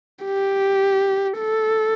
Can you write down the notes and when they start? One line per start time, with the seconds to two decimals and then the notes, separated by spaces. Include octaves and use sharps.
0.25 G4
1.38 A4